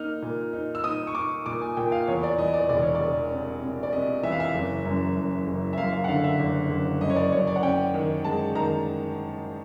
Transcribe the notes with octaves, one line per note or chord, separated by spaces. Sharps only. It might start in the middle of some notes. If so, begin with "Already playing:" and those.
Already playing: A#3 D#4 F6
A#2
D#4
E6
D#4 D#6
C#6
D#4 D6
A#2 D6
G#5
A#2 G5
F5
E2 C#5
D5
E3 D#5
D5
E1 D5
C#5
D5
E1
C3
C3
D5
C3 D#5
E3 E5
F5
E5
F#1
F#2
F#2
F#1
E5
F#2 F5
F5
F#5
D3 F5
E5
F#1
F#1
F#2 D#5
C#5
D5
F#2 C#5
D5
F#5
C#4 G5
D#3
G#3 A5
D#3 A#5